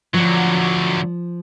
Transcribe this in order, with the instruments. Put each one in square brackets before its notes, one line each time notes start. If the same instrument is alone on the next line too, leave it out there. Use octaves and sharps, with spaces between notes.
[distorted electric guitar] D3 F#3 [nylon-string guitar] F3